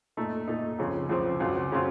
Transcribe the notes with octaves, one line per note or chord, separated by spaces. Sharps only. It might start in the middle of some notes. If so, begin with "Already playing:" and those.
A#2 A3 D#4
A#2 A3 D#4
C#2 C#3 F3 C4
C#2 C#3 F3 C4
C#2 C#3 F#3 C4 F4
C#3 F#3 C4 F4